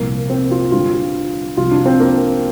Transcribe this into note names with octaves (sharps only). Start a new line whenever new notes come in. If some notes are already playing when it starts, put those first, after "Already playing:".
Already playing: C2 A#2 F3 A#3
C4
F4
G2 D3 G3 F4
C2 C3 F3 F4
D4
C4
A#3